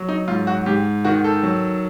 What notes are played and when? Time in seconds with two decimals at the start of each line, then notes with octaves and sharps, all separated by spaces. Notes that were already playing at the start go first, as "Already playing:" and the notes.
Already playing: F#3
0.09 D#4
0.28 G#2 F4
0.47 F#4
0.66 G#2 G4
1.05 D#3 F#4
1.24 A4
1.43 F#3